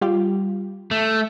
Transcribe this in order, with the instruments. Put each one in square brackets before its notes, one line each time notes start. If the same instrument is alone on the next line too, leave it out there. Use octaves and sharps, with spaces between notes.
[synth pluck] G3 F4 G4
[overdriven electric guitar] A3